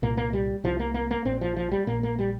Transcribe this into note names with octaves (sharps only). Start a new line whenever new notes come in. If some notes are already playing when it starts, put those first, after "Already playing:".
C2 A#2 A#3
A#3
G3
C2 C3 F3
A#3
A#3
A#3
A#1 A#2 C4
F3
F3
G3
A#1 A#2 A#3
A#3
G3